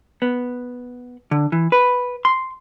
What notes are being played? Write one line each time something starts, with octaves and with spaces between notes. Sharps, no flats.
B3
D3
E3
B4
C6